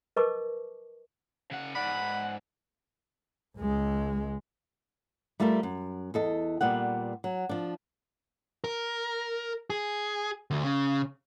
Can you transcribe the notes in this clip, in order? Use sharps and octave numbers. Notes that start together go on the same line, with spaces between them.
A#4 B4 D#5 A5 C#6 D6
C#3 F#5
G#2 D5 F#5 B5
C#2 G#3
G3 A3 F4 A4 A#4
F#2
E2 A4 D#5
A#2 G3 B3 F#5
F#3
F3 D4
A#4
G#4
D2
C#3